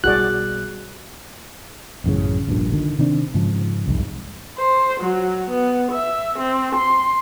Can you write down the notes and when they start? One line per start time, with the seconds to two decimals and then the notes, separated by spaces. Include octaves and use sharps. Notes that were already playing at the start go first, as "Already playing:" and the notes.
0.04 B1 G3 F#4 G#4 D5 F#6
2.04 A1 F#2 A2 C#3
2.47 F1 A#1 G2 A#2
2.73 D3 D#3
2.99 C3 D#3 C4 D4
3.34 G#2 C#3 F3
3.88 C2 F2 G#2
4.57 C5
5.01 F#3
5.51 B3
5.92 E5
6.39 C4
6.76 C6